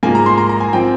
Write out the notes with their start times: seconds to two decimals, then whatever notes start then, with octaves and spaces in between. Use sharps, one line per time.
0.03 G#2 F3 A#3 G#5
0.15 A#5
0.26 C6
0.37 A#5
0.49 A#5
0.60 G#5
0.73 F3 C4 G5